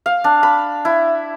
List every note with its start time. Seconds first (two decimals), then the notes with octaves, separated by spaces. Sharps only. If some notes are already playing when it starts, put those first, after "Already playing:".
0.06 F5
0.24 D4
0.43 B5
0.85 E4